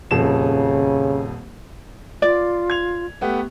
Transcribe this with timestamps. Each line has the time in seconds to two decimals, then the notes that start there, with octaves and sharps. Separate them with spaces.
0.11 D#1 F2 C#3 E7
2.22 F4 D5 D6
2.70 G#6 F7
3.21 A3 B3 G4